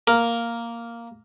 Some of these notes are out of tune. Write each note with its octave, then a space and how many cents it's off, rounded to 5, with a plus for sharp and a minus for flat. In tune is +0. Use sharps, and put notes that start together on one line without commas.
A#3 +0 A#4 +0